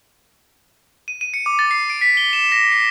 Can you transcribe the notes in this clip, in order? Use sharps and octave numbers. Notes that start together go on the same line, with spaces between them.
D#7
D#7
C#7
D6
A6
C7
D7
B6
G7
E7
A#6
C7